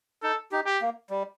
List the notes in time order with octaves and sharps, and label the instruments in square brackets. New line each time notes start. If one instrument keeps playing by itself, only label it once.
[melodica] D#4 [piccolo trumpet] A4
[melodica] D#4 G4
[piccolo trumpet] G4
[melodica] A#3
G3